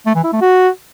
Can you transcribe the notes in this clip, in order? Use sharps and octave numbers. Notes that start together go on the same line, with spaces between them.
A3
E3
E4
A3
F#4